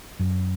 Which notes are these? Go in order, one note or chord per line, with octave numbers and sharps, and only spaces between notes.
F#2 F#3